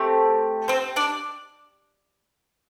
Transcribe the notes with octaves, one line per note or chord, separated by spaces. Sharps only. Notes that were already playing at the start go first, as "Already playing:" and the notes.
Already playing: A3 C4 G4
C4 C5
D4 D5